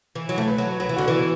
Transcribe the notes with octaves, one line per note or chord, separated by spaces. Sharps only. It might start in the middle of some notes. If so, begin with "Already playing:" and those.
E3
F#3
A3
B4
F#3
F#3 B4
E3
D3 F#4
E3
B3